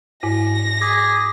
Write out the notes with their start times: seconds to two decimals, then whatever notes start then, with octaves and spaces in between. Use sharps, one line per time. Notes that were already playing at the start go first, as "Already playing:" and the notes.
0.23 G#2 E4 A#6
0.82 G#4 D6 D#6 B6